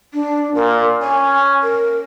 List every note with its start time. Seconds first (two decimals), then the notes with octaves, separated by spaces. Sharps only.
0.14 D4
0.55 A#2 A#4
1.02 C#4 G#5
1.62 A#4